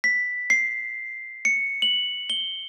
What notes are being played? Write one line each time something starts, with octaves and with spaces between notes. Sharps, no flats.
B6
C7
C#7
F#7
G7